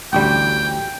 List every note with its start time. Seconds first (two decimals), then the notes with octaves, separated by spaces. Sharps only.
0.13 A1 D2 G3 G5